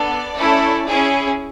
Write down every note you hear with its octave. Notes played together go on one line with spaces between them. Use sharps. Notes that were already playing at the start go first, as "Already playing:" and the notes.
Already playing: B3 D4 A4 D5
A3 C#4 E4 A4
C#4 E4 G#4